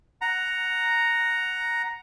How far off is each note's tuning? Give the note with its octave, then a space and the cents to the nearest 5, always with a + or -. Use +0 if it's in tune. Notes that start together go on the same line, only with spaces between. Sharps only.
F#5 +0 A#5 +0